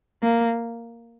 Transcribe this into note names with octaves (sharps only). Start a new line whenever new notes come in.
A#3